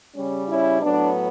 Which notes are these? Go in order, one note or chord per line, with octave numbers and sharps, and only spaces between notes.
C#3 G3 C#4
C#4 E4
A2 F#3 B3 D4